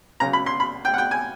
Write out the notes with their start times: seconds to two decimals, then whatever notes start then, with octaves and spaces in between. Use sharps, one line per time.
0.20 C#2 C#3 F#3 A#5
0.33 B5
0.46 C6
0.60 B5
0.85 G5
0.94 F#5
0.98 G5
1.11 G#5